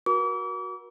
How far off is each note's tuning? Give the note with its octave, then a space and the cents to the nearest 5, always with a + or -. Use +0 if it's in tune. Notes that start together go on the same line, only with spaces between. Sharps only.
F#4 -5 A#4 +35 D6 -40